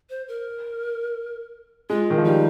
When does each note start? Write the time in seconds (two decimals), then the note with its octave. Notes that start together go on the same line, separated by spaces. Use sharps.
0.10 C5
0.28 A#4
1.90 G#3 F4
2.10 D#3
2.18 F3
2.25 G3 D#4